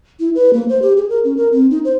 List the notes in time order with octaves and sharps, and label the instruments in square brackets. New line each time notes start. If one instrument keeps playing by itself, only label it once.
[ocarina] E4
B4
A#3
C5
G4
G#4
A#4
C#4
A#4
C4
D#4
C5